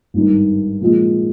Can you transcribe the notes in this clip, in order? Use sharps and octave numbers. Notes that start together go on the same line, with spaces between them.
G#1 G2 D#3
A#2 F3 G#3